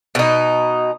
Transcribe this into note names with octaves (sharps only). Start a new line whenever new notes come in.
B2 D#4